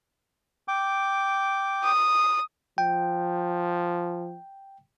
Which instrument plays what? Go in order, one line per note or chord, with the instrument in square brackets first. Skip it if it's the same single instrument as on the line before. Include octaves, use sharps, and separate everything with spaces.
[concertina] G5 D6
[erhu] D#6
[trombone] F3 [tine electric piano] G5